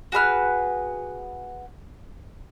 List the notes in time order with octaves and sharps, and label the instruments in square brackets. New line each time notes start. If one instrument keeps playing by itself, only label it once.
[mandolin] F#4 G#4 B4 F6